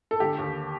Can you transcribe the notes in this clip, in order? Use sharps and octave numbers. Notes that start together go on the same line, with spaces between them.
A4
D3 G4
D#2